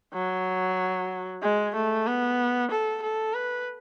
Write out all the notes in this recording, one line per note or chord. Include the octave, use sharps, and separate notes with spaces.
F#3
G#3
A3
B3
A4
A4
B4